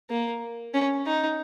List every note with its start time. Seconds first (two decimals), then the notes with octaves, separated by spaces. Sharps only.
0.10 A#3
0.74 C#4
1.06 D#4